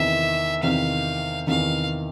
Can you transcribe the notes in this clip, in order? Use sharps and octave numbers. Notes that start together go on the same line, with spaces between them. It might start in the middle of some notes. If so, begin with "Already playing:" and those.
Already playing: E2 C3 D#3 E5
E2 C3 D#3 F5
E2 C3 D#3 F5